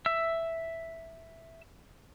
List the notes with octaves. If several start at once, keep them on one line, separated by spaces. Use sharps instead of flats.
E5 E6